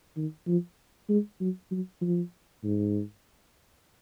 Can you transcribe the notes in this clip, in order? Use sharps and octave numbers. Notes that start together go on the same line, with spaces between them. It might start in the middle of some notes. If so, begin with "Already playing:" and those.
D#3
F3
G#3
F#3
F#3
F3
G#2